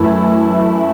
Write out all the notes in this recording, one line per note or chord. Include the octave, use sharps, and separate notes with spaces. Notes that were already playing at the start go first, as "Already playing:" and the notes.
Already playing: F#2 E3 A3 E4